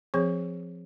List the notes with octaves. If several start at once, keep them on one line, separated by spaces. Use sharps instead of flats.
F3 C4 G#4 C#5